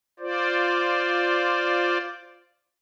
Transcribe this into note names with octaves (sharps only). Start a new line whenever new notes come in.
F4 C5 D5